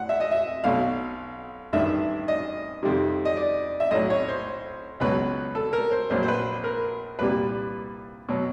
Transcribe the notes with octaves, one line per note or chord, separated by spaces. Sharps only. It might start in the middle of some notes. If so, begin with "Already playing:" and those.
Already playing: A2 F#5
E5
D#5
E5
B1 B2 F#3 F5
A1 G2 D#3 E5
D#5
F2 C3 D#3 G3
D#5
D5
E5
B1 A2 F#3 D#5
C#5
C5
C#2 B2 F#3 B4
A4
A#4
C5
A#1 A#2 F#3 C5
C5
B4
A#4
C2 A#2 G3 B4
B2 F#3